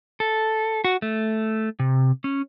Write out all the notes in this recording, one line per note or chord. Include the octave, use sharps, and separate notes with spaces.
A4
F#4
A3
C3
C#4